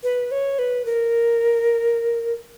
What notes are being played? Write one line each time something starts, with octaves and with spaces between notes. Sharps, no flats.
B4
C#5
B4
A#4